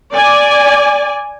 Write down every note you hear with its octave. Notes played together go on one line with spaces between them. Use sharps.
D5 G#5